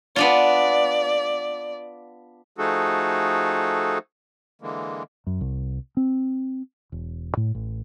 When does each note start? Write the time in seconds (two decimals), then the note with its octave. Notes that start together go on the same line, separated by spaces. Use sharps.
0.16 B3 D4 F4 D5
2.58 F3 A3 D#4 F#4 G#4 A4
4.62 D3 E3 G#3 A#3
5.27 F#2
5.41 C2
5.97 C4
6.92 E1
7.37 A2
7.55 A1